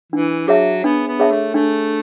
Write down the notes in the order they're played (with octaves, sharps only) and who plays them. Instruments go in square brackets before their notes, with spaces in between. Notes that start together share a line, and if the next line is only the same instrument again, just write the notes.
[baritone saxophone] E3 [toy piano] D4
[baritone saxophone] F#3 [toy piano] G#4 C#5 E5 A5
[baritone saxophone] B3 [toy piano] D4
[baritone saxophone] B3
[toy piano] G#4 C#5 E5 A5
[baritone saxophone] A3
[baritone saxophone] A3 [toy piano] D4